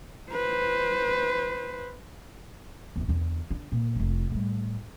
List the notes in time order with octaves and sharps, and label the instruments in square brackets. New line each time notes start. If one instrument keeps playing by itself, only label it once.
[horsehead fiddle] B4 C5
[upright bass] E2 E3
E2 D3
D3
A#2
F1 F4
A2 G3